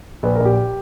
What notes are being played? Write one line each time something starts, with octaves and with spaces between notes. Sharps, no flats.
A#1 B4
A#4
A#1
G4